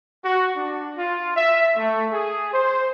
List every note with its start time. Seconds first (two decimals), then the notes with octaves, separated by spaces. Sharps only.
0.25 F#4
0.57 D4
0.98 F4
1.37 E5
1.77 A3
2.13 G#4
2.53 C5